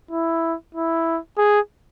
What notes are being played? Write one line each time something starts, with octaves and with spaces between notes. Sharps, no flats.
E4
E4
G#4